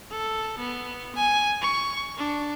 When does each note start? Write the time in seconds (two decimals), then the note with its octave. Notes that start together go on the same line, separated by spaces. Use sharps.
0.11 A4
0.59 B3
1.16 G#5
1.62 C#6
2.18 D4